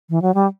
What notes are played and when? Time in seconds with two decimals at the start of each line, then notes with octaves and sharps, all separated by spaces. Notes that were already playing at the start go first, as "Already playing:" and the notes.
0.10 E3
0.22 F#3
0.34 G3